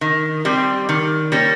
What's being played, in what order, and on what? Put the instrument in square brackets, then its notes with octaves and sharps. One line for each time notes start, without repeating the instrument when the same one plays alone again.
[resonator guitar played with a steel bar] D#3
G3 C4
D#3
G3 A#3 C#4